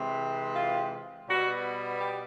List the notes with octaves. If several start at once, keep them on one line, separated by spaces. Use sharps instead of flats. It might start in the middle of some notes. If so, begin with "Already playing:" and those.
Already playing: C3 E3 G#3 C4
F4
B2 G3 B3 F#4
G4